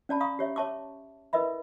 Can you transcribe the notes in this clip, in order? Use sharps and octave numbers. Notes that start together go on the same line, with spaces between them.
C#4 D5 A5 B5
F5 A#5 B5 C#6 D#6
G4 C#5 E5
C#5 E5 A5 C#6 D6
E4 A#4 B4 D#5 E5 B5